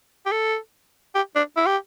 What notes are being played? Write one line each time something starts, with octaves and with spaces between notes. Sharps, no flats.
G4
A4
G4
D4
E4
G4